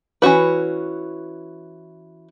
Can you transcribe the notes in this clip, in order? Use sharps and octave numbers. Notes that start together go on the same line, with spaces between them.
E3 C#4 F#4 B4